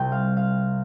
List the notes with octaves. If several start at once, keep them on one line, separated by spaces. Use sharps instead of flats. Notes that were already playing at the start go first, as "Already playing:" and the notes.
Already playing: C2 C3 G3 G5
F5
F5